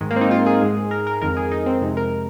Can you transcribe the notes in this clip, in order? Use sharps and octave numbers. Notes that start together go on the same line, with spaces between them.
G#2 D#3 G#3
A#3
C4
D#4
F4
G#4
G#2 G#3
A#4
A#4
F2 D#3 G#3 A#4
G#4
D#4
C4
F2 C3 G#3
A#4